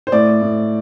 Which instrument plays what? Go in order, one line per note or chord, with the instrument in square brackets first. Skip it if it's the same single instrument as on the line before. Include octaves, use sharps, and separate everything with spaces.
[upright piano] C5
A2 D5
A2